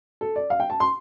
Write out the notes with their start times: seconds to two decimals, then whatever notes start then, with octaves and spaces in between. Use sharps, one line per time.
0.21 A4
0.36 D5
0.50 F5
0.60 G5
0.70 A5
0.80 C6